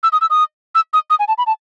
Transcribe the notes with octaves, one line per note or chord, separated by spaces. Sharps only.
E6
D#6
E6
D#6
E6
D#6
D#6
G#5
A5
B5
A5